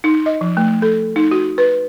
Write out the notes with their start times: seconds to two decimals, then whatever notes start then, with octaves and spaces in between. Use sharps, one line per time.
0.04 D#4
0.26 D#5
0.41 F3
0.57 A3
0.82 A4
1.16 D#4
1.31 F#4
1.58 B4